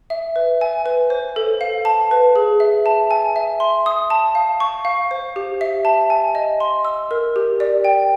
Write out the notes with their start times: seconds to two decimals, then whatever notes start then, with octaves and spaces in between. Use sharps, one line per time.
0.10 E5
0.36 B4
0.61 G#5
0.86 B4
1.10 C5
1.36 A4
1.61 F5
1.85 A5
2.11 B4
2.36 G#4
2.60 E5
2.86 A5
3.11 G#5
3.36 E5
3.60 C6
3.86 D#6
4.10 A5
4.35 F5
4.60 C#6
4.85 F5
5.11 C5
5.36 G4
5.61 E5
5.85 A5
6.10 G#5
6.35 D#5
6.60 C6
6.85 E6
7.11 A#4
7.36 G4
7.60 D5
7.85 G5